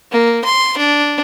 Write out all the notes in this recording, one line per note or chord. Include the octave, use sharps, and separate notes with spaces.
A#3
C6
D4